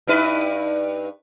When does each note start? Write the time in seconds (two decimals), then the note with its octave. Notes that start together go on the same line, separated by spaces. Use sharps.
0.07 G2 D#4 B4